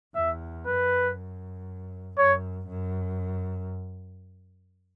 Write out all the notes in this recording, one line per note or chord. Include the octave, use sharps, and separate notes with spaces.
E2 E5
F#2 B4
F#2 C#5
F#2